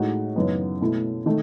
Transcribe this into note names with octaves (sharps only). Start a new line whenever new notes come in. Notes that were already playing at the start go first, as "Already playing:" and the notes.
Already playing: A2 G#3 D#4 F#4
F#2 C#3 E3 B3 D#4
B2 A3 E4
D#3 A3